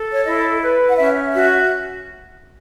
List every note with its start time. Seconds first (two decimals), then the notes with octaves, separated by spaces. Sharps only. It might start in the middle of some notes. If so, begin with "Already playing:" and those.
Already playing: A4
0.13 C#5
0.24 E4 D#5
0.62 B4
0.90 F#5
0.97 C#4 E5
1.35 F#4 E5